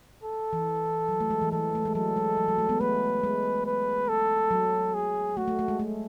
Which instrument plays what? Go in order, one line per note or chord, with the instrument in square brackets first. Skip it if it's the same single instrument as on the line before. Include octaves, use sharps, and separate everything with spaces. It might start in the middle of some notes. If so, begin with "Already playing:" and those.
[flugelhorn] A4
[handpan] E3
F#3
A3
G#3
E3
[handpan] E3 [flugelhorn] A4
[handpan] A3
G#3
[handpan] F#3 [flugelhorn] A4
[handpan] G#3
F#3
F#3
A3
G#3 B3
[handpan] A3 [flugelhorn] B4
[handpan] G#3
[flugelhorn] B4
A4
[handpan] F#3
[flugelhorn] G#4
[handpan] A3 [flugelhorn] F#4
[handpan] A3
A3
G#3
A3